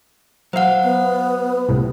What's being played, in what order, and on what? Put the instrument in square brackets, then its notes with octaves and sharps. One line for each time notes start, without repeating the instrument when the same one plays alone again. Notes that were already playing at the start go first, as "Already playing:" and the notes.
[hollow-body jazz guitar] F#3 F5 [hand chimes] C5 F#5
[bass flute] B3
[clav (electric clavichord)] C2 A2 C3